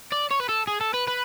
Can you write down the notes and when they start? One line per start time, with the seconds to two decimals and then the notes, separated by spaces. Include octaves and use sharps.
0.12 D5
0.31 C#5
0.40 B4
0.49 A4
0.67 G#4
0.81 A4
0.94 B4
1.08 B4